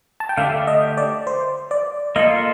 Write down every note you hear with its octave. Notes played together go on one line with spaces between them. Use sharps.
A5
G5
D3 A3 D4 G4 F5
D#5
D5
C5
D5
A#3 F4 A4 D#5